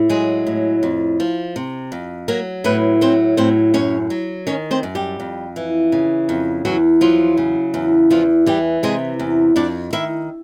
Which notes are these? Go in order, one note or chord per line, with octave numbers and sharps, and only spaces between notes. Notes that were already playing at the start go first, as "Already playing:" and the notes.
Already playing: A2
F#3 G#3 G#4
A2
F2
F3
C3
F2
F#3 A#3 A#4
A2 B3 B4
F#3 C4 C5
A2 C4 C5
F#2 C#4 C#5
F#3
D#3 C#4 C#5
C4 C5
F#2
G3 G4
F2
E3
C#3
F2
E2 F#3 F#4
F3 F#3 F4
C#3
E2
E2 F3 F4
E3 G3 G4
C3 G#3 G#4
E2
F2 D4 D5
D#3 E4 E5